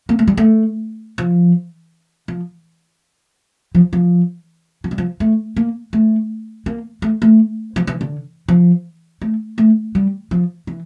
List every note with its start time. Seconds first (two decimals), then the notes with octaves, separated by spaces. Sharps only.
0.09 A#3
0.19 A3
0.28 G3
0.37 A3
1.18 F3
2.28 F3
3.75 F3
3.93 F3
4.84 F3
4.91 G3
4.98 F3
5.20 A3
5.56 A#3
5.93 A3
6.66 A#3
7.02 A3
7.22 A3
7.76 F3
7.87 E3
8.01 D3
8.49 F3
9.22 A3
9.58 A3
9.95 G3
10.31 F3
10.67 E3